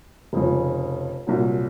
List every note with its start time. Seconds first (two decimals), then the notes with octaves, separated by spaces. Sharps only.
0.33 F1 F2 C#3
1.27 C2 A#2 F#3